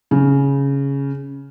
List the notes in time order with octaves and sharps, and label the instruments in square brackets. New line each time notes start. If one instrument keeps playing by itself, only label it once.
[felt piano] C#3